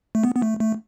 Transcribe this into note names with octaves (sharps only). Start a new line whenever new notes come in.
A3
B3
B3
A3
A3